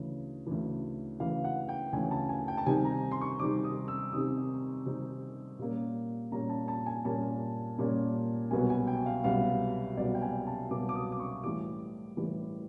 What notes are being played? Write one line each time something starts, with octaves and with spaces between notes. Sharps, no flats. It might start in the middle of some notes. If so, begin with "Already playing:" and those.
Already playing: D2 C#3 E3
D2 C#3 E3
D2 C#3 E3 F5
F#5
G5
D2 C#3 E3 G#5
A5
G#5
G5
A5
C3 D#3 G3 C4 D#4 G#5
A#5
C6
C#6
C3 D#3 G3 C4 D#4 D6
D#6
E6
C3 D#3 G3 C4 D#4 D#6
C3 D#3 G3 C4 D#4
A#2 G3 A#3 C#4
A#2 G3 A#3 C#4 A#5
A5
A5
G#5
A#2 G3 A#3 C#4 A5
A#2 G3 A#3 C#4
C2 B2 F#3 B3 G#5
G#5
G5
F5
C2 B2 F#3 B3 F5
C2 B2 F#3 B3 D5
G5
G#5
A5
C2 B2 F#3 B3 D6
D6
D#6
D6
C#6
A2 E3 G3 D6
A2 E3 G3